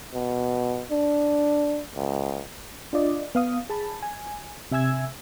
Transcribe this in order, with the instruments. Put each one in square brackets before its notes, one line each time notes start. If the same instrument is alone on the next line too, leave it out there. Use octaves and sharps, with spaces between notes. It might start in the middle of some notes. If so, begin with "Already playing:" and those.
[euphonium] B2
D4
C#2
[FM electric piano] D4 F4 D5 D#5
B3 F5 D#6
G#4 A5 B5
G#5
C3 E5 G#5 E6 G#6